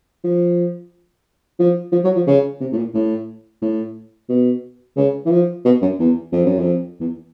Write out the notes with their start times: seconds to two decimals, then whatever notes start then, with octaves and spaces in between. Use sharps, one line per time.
0.24 F3
1.59 F3
1.92 F3
2.04 F#3
2.16 F3
2.27 C#3
2.60 C3
2.72 A2
2.77 A#2
2.94 A2
3.62 A2
4.29 B2
4.97 C#3
5.25 E3
5.31 F3
5.65 B2
5.82 F#2
5.99 E2
6.32 F2
6.46 F#2
6.59 F2
7.00 E2